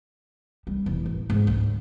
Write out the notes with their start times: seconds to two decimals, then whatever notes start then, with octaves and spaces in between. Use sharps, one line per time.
0.67 G3
0.86 E1
1.06 A1
1.30 G#2
1.47 D2